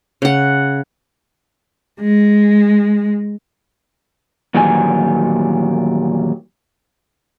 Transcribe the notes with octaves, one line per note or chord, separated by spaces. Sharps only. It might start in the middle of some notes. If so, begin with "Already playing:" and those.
C#3 F#5
G#3
E2 A#2 D#3 F#3 G3 G#5